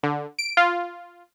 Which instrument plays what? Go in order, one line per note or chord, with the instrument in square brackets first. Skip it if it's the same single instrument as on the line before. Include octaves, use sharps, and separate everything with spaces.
[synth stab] D3
D7
F4